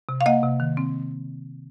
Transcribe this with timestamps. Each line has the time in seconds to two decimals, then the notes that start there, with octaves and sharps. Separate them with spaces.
0.09 C3
0.21 F5
0.26 A#3 D#5 F#5
0.43 C3
0.60 D#3
0.77 C4